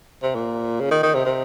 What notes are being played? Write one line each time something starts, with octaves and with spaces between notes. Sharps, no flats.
C3
A#2
C#3
D#3
D#3
C3
C3